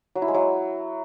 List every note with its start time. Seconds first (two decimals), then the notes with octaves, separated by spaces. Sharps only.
0.15 F#3
0.22 E4
0.28 G#3
0.35 F#3